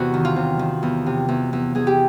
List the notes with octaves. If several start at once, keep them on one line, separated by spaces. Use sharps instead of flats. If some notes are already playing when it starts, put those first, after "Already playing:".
Already playing: E2 C3 F#4
D#3
F4
C3
D#3
E2
C3
E2
E2
E2 G#4
G4